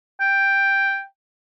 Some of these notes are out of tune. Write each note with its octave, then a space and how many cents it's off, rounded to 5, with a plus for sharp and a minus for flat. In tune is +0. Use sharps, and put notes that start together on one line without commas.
G5 +5